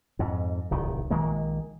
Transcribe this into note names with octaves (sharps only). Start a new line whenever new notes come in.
F2 G#2
D1 C2 D#3
A#1 D#3 G#3 A#3